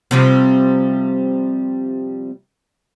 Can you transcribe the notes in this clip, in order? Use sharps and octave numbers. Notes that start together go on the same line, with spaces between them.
C3 F3 G3